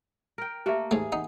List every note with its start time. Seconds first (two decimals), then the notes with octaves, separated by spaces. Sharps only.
0.38 A#4 G5
0.66 A3 A#3 G4 E5
0.91 G#2 A3 G#4
1.12 D#4 F#5